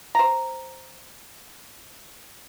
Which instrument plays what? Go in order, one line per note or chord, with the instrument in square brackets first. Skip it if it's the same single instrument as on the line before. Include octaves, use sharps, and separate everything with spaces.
[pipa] C5 A#5